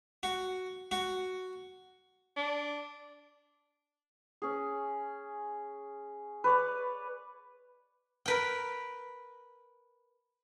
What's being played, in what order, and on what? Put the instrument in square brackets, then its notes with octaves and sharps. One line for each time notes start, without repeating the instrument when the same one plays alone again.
[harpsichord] F#4
F#4
[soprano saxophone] D4
[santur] C#4 G#4
B4 C#5 D5
[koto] A#4 B4 G5